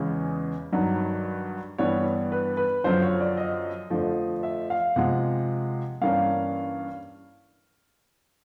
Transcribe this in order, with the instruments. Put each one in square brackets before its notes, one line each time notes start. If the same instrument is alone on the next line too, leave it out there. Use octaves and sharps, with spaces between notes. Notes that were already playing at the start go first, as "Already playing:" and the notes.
Already playing: [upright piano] E2 C#3 E3 G#3 C#4
G2 D#3 F#3
G2 E3 G3 B3 C#5
B4
B4
F#2 D3 F3 C5
C#5
D5
D#5
F2 D3 F3 A3
E5
F5
C3 F3 G#3 F#5
G2 E3 G3 A#3 C#4 F5